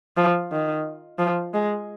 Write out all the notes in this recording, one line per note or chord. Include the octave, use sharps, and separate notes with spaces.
F3
D#3
F3
G#3